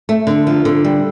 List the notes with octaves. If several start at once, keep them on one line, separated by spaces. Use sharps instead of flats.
A3
D3
F3
D3
G3